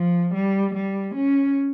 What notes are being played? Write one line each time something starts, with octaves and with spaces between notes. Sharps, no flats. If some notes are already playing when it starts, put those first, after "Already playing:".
Already playing: F3
G3
G3
C#4